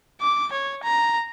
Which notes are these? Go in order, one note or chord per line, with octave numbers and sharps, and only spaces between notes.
D6
C#5
A#5